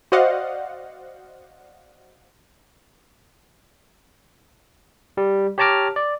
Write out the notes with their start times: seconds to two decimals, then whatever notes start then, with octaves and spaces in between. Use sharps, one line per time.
0.12 F#4 C5 D5 D#5 F5 F#5
5.17 G3
5.58 G4 C#5 A5 A#5 D6 F6
5.96 D5